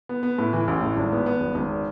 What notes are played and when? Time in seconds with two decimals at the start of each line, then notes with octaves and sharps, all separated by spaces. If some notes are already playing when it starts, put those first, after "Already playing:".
0.09 B3
0.23 B3
0.38 A2
0.53 E3
0.68 A1
0.82 A2
0.97 G#1
1.12 B3
1.26 B3
1.41 G#1
1.55 G#1